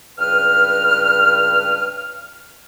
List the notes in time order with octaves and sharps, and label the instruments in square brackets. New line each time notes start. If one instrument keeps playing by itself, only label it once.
[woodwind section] C#2 G2 B4 F6